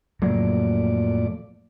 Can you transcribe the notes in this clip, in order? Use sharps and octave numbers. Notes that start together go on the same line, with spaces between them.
F2 A2 F#3 A#3 D5